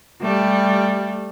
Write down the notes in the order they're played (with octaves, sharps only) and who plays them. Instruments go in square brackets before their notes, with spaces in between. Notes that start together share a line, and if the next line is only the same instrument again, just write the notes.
[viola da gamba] G3 A3